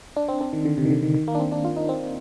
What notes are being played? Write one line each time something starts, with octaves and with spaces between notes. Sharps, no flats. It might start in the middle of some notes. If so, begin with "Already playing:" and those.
D4
C4
C4
D#3
D3
C3
D#3
D3
D#3
D#3
A#3
D4
C4
D4
F4
D#4
C4